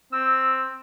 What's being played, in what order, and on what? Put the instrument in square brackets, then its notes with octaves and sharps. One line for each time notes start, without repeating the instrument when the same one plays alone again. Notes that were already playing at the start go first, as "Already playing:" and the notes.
[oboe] C4 [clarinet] E6